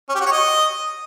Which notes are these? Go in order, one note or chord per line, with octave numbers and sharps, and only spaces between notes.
C#4
G4
F#4
C#5
D#5